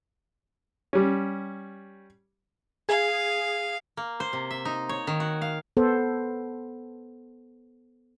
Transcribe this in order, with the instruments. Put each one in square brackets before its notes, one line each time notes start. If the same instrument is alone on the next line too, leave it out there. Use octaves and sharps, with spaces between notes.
[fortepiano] G3 C#4
[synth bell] G#4 [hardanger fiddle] F5
[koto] A#3
C5
C3
E5
D#4
C#5
D#3
F#4
F5
[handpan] B3 A4 C5